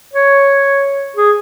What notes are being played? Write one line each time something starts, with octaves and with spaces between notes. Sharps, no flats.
C#5
G#4